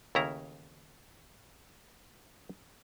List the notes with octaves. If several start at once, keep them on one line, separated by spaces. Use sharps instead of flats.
D#2 C#3 A3 C#4 E4 A#5